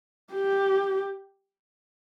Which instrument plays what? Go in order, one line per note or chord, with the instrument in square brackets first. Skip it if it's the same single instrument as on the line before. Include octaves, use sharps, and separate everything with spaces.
[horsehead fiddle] G4